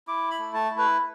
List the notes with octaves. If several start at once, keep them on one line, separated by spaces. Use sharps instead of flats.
E4 D6
B5
A3
A5
E4
B4